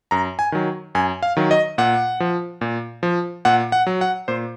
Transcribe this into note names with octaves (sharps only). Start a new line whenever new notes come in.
F#2 A#5
G#5
D#3 F#3
F#2 G#5
F5
D#3 F#3
D#5
A#2 F#5
F3
A#2
F3
A#2 F#5
F#5
F#3
F#5
A#2 C5